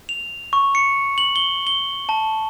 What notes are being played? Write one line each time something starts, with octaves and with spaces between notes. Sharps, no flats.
F7
C#6
C#7
F#7
G7
G7
A5